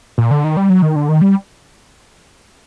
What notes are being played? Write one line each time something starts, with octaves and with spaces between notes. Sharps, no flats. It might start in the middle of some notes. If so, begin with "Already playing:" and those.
A#2
D3
D#3
G3
F#3
D#3
D3
D#3
G3